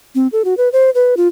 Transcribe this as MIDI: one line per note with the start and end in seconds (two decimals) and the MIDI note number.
0.15 0.27 60
0.32 0.42 69
0.45 0.54 66
0.57 0.69 71
0.73 0.90 72
0.95 1.15 71
1.17 1.28 65